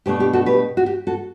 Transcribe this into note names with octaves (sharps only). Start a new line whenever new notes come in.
B2 A3 D4 G4
G4
F#4 A4
G4 B4
F#4
G4
F#4 A4